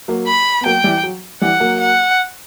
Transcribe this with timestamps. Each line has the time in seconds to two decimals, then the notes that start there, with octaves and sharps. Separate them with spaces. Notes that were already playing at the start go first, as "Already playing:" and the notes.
0.08 F#3 A#3
0.28 B5
0.61 B3
0.66 F#3 A#3 G5
0.84 E3 G3
1.03 F#3
1.41 E3 G3 F#5
1.60 F#3 A#3
1.80 F#5